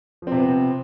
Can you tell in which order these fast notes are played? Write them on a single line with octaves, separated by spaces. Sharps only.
F3 C4 C3 B3